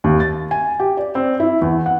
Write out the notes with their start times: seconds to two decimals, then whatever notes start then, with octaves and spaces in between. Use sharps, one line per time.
0.04 D#2
0.20 A6
0.51 G#5
0.79 G4
0.97 D5
1.15 C4
1.40 E4
1.62 E2
1.86 F#5